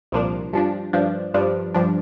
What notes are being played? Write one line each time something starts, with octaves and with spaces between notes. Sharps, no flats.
C2 A#2 F3 A#3 D4
G2 F3 D4
G2 F3 D4
G2 F3 D4
G2 F3 D4